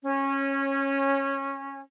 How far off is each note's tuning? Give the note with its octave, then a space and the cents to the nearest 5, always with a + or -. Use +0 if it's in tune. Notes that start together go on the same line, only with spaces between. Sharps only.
C#4 -15